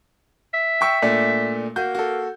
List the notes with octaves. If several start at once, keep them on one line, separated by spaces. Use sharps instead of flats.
E5
G5 C#6 E6
A#2 A3 D4
A#3 F#4 G6
F#4 A4